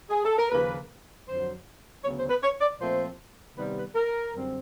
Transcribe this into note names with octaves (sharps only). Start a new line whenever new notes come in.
G#4
A4
A#4
D#2 C#3 F3 A#3 B4
F2 D3 F#3 C5
D2 C#3 F#3 B3 C#5
C5
B4
C#5
D5
A#2 F3 A3 C4 C5
C3 D#3 G3 B3 B4
B4
A#4
F#2 D3 G3 C4